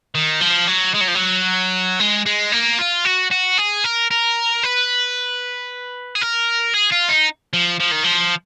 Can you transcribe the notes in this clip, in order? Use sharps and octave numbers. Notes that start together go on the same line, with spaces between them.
D#3
F3
F#3
G#3
F#3
F3
F#3
G#3
G#3
A#3
F4
F#4
F#4
G#4
A#4
A#4
B4
G#4
A#4
G#4
F4
D#4
F3
F3
D#3
F3